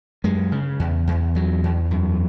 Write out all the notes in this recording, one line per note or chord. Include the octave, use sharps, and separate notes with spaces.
F#2 G#3
C#3
E2
E2
E2 F#3
E2
F#2